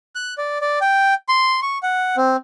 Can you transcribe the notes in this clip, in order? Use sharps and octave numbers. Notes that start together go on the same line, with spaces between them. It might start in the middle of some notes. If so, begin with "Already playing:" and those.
F#6
D5
D5
G5
C6
C#6
F#5
C4